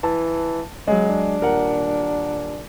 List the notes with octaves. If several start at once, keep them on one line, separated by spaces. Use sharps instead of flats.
E3 A5
C#3 F#3 G#3
D4
D#1 A#4 F#5